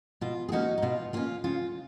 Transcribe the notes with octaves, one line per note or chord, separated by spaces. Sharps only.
B2 F4
G#4
A#3 C#4 D#4 F#4
D#4
B2 F4
A#3 C#4 F4
C#3 F4